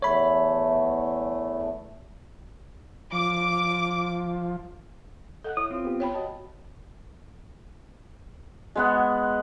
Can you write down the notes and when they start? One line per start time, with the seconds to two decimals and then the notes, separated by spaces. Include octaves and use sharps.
0.02 E2 A3 C#5 B5
3.13 F3 D6
5.44 A4 D#5 F#5 F#6
5.57 E4 C#5 D#6
5.71 C4 F4
5.84 B3 G4
6.00 C#5 G5 B5
6.14 F#4 D#5 A5
8.76 G#3 B3 F#5